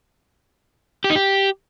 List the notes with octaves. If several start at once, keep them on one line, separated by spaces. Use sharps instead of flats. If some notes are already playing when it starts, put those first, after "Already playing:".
G4
D#4
G4